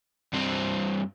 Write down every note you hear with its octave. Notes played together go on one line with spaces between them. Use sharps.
G2 C4